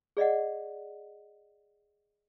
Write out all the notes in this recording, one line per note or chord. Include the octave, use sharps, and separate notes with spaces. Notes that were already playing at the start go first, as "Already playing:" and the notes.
G#4 D5 D#5 F#5